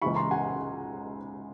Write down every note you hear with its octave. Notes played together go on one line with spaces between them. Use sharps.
C#2 C#3 E3 B5 C#6
A#5 C6
F#5 G#5